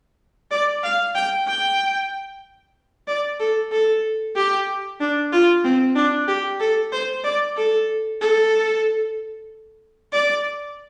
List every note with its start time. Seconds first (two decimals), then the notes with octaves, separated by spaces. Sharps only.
0.51 D5
0.83 F5
1.15 G5
1.47 G5
3.08 D5
3.40 A4
3.71 A4
4.36 G4
5.00 D4
5.32 F4
5.64 C4
5.95 D4
6.28 G4
6.60 A4
6.92 C5
7.24 D5
7.57 A4
8.21 A4
10.13 D5